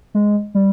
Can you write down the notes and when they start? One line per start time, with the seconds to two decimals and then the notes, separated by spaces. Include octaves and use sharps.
0.15 G#3
0.55 G3